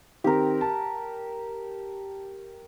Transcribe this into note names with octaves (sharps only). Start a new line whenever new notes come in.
D#3 C4 G4 A#4
A5